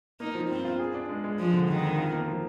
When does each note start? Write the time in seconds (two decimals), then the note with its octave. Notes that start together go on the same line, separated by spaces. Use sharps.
0.20 A#3 D#4
0.35 F3
0.50 G2 C4
0.65 F4
0.79 G#4
0.94 D4
1.09 G#3
1.24 G#3
1.39 F3 G#3
1.53 D3
1.68 F2 D#3
1.83 F2
1.98 F4
2.13 A#3
2.27 F3